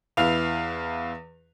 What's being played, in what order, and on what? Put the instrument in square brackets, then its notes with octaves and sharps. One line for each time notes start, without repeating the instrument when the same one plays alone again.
[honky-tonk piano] E2 E4 B4 F5 F6 F7